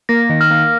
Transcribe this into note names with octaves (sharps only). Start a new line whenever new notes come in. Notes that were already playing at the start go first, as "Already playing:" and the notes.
A#3 A#6
D#3
F6
A#3